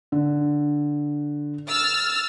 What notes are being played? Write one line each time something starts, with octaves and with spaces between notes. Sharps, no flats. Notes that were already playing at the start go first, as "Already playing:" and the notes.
D3
E6 F6 A6